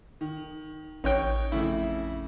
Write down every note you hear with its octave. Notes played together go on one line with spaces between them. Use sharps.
D#3
A1 D#4 C#5 G5
F2 C#3 A3 E4